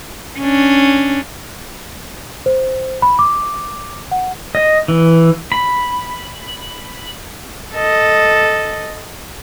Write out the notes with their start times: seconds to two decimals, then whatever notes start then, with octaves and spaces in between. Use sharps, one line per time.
0.40 C#4 D4
2.46 C5
3.02 B5
3.19 D6
4.11 F#5
4.55 D#5
4.88 E3
5.52 B5
7.75 A4 D#5